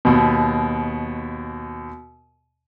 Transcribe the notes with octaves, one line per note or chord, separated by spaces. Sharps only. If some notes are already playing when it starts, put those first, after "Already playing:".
D#2 B2